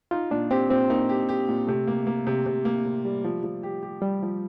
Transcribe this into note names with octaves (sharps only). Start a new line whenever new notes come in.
D#4 F4
A#2 D4
C4 G4
A#2 C4
A#3 D#4
G4
G4
A#2
C3 A3
A#3
A#3
C3
C3
A#3
C3
G3
F3
F3
G4
G4
G3 G4
F3